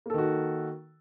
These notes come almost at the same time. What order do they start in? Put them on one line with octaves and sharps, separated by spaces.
A#3 A4 D#3 F#4